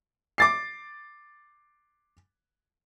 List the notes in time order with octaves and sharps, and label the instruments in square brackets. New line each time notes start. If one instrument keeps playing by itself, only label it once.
[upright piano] D6 A6 C7